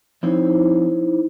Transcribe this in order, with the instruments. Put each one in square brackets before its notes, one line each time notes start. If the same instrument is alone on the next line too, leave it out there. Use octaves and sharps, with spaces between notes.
[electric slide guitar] F3 C4 C#5 [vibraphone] D#4 E4 C5